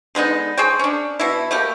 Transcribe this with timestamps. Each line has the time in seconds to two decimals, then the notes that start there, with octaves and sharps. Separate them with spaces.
0.15 D3 G#3 B3 D#4
0.57 G#4 C5 C#5 G5
0.79 C#4 D4
1.20 B2 E4
1.51 A3 A#3 G4